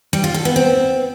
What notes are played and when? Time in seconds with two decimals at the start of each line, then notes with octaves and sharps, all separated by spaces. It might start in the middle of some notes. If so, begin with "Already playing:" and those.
0.13 G3
0.24 F4
0.34 A4
0.45 B3
0.56 C4